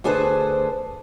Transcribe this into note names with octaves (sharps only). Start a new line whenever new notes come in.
D2 D4 G#4 A4 B4 C5